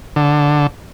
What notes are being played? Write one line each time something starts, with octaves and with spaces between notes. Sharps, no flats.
D3